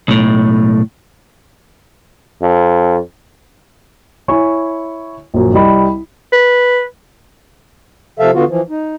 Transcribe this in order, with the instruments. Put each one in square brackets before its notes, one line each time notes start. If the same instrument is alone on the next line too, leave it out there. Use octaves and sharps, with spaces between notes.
[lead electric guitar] B1 A2
[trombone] F2
[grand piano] E4 C#5 G#5 C#6
A#1 F#2
C2 G3 D#5 B5
[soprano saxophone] B4
[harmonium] C3 F3 A4 E5 F5
D3 B3 F4 F#4
E3 F3
D#4